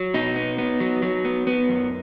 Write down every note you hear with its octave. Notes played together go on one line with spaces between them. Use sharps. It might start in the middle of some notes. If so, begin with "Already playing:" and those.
Already playing: F#3
B2 D#4
B3
B3
F#3
F#3
B3
B3
F#2